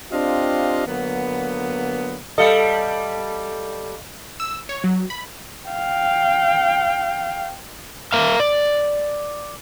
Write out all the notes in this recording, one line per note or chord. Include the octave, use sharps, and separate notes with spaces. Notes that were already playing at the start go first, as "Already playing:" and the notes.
C4 D4 F4 G4 D#5 F5
D3 F#3 A#3 B3
G3 A4 D#5 F5
E6
C#5
F#3
B5
F5 G5
A#4 E5 F5
D5